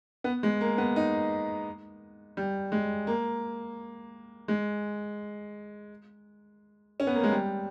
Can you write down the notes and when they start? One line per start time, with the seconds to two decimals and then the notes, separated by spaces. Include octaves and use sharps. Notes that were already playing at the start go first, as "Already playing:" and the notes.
0.24 B3
0.43 G#3
0.61 A#3
0.78 B3
0.96 D#4
2.37 G3
2.72 G#3
3.07 A#3
4.48 G#3
7.00 C#4
7.07 B3
7.15 A#3
7.23 G#3
7.31 G3